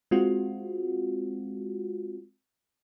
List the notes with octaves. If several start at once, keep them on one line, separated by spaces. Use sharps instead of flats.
G#3 C4 F4 F#4